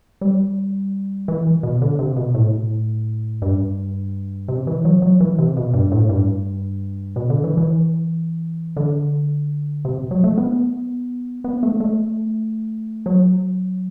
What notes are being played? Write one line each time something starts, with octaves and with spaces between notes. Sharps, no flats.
G3
E3
B2
D3
C3
B2
A2
G2
C3
E3
F#3
F#3
E3
C3
B2
G2
A2
G2
B2
D3
E3
E3
D3
C3
F#3
A3
B3
B3
A3
A3
F#3